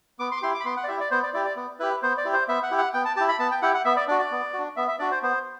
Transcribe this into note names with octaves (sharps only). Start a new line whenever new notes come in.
B3 D6
C6
D6
E4 G4 C6
D6
B5
B3 C6
F#5
D5
E4 G4 E5
D5
B3 C5
D5
E4 G4 D5
D5
B3
E4 G4 B4
B3 C5
D5
E4 G4
C5
B3 E5
F#5
E4 G4
F#5
B3 G5
A5
E4 G4 A5
B5
B3 A5
G5
E4 G4 F#5
F#5
B3 E5
D5
D4 F#4 D5
D5
B3
F#4
D4
B3 E5
E5
D4 F#4 D5
C5
B3 C5